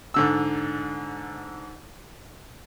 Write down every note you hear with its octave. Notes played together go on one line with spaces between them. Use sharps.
G#2 D3 E6